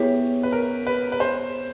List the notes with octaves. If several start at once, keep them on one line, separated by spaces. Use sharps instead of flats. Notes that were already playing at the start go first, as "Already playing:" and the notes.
Already playing: B3 E4 G4 G#4 C#5
B4
A#4
B4
B4
C5